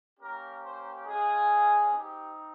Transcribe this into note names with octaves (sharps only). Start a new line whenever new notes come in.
A#3 C#4 G4 A#4
C5
G#3 C#4 F4 G#4
C4 D#4 G4